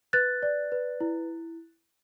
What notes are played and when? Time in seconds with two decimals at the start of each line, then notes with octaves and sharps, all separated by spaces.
0.13 B4 F#6 A6
0.43 D5
0.72 B4
1.01 E4